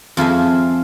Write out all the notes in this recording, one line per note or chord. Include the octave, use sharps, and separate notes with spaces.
F2 F4 G#4 E5